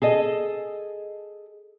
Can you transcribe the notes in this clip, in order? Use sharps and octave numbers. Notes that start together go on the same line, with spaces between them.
G#4 A4 D#5